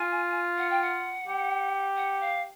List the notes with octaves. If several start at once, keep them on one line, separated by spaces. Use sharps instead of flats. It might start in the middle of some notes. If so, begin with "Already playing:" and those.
Already playing: F4 G#5
F#5
G5
F#5
G4
F#5
F5